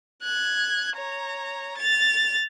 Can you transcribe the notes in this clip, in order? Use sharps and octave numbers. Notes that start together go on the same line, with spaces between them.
F#6 G#6
C#5 A#5
A6 F7